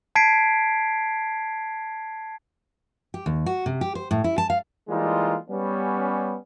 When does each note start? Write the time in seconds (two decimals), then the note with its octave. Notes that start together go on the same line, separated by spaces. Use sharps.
0.15 A5 G#6 B6 C7 D7
3.14 G4
3.26 D#2
3.46 F#4
3.66 C3
3.81 G4
3.95 C5
4.11 A2
4.24 E4
4.38 A5
4.50 F5
4.88 E3 G3 G#3 A#3 D#4 F4
5.49 G3 B3 C#4